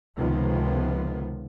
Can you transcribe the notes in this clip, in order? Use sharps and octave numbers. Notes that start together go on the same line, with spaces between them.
C#2 C3 D#3 F3 B3